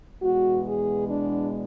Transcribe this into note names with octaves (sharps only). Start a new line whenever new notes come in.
E2 B2 G#3 B3 F#4
G#4
D4